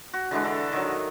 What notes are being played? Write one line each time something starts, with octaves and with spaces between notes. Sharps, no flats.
F#4
D3 E3 G#3 D4
A4 E5 A#5
D#3 F#3